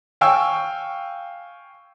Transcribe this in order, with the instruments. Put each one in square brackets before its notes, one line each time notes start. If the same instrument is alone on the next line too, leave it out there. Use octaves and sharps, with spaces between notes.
[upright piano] F5 G5 G#5 C#6 E6